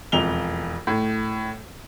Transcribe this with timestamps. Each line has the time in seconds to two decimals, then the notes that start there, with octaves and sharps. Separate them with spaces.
0.12 E1 F2 F7 G7
0.87 A2